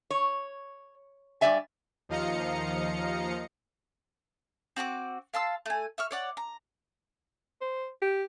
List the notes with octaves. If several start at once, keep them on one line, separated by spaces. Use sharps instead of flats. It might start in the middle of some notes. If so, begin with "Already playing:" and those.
C#5
G2 C4 G4 D5 E5 G#5
D#2 F3 D#5 F5 A#5 C#7
C4 F#4 A5 D6
F5 A5 C6 E6
A3 G#5
E5 C#6 F6
C#5 D5 F#5
A#5
C5
G4